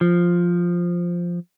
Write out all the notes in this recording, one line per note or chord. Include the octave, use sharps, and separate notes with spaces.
F3